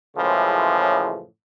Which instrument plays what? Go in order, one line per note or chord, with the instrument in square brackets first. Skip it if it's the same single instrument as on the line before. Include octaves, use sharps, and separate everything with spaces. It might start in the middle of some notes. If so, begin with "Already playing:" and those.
[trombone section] F#2 A2 C#3 E3 F3 G#3